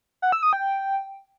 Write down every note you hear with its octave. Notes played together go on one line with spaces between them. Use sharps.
F#5
E6
D#6
G5